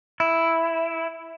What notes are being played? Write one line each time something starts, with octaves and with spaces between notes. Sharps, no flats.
E4